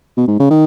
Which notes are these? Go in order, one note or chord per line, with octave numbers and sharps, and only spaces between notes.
B2
G#2
C#3
D#3